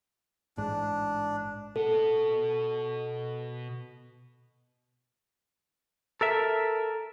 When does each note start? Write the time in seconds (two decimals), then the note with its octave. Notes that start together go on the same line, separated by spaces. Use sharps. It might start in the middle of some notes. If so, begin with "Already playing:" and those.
0.57 A1 G#2 D4
1.76 B2 A4 F#5
6.21 A4 A#4 E5